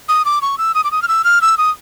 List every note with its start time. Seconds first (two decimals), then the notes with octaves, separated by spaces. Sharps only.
0.09 D#6
0.25 D6
0.42 C#6
0.58 E6
0.75 D#6
0.84 D6
0.92 D#6
1.02 F6
1.08 E6
1.24 F6
1.42 E6
1.58 D#6